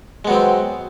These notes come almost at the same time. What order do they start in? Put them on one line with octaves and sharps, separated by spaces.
G#3 B3 F#3 C4